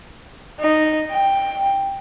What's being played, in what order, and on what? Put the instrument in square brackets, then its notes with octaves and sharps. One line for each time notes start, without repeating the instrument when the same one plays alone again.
[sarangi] D#4
G5